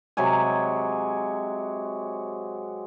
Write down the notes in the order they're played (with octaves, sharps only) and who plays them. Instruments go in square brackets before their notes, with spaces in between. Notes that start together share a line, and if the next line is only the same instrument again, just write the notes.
[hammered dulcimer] C3 F#3 G#3 G#5